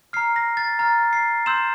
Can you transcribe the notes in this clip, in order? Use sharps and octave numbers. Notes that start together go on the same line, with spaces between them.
A#5 F6 C7
A#6
A6
A#5 F6 A6
C7
C6 E6 G6 E7